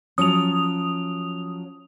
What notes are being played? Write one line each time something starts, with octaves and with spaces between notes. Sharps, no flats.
F3 F#3 C#4 D#6 F7